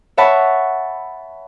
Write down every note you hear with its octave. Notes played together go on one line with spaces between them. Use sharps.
C#5 E5 F#5 A5 B5